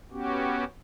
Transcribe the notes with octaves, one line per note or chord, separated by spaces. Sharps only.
B3 C#4 F#4 G4